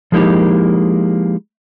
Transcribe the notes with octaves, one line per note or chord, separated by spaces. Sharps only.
F3 G#3 A#3 D#4 E4 G4